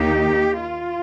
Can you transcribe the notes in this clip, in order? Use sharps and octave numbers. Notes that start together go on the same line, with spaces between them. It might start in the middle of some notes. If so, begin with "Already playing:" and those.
Already playing: D#2 D#3 A#3 D#4 G4
F4